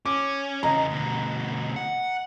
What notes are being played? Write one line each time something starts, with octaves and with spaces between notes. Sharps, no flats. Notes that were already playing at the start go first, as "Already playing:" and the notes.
C#4 D6
E2 C#3 D#5 A#5
D2 B2
F#5